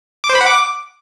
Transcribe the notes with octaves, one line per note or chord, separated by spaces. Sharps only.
D6
C5
B5
F#5
D6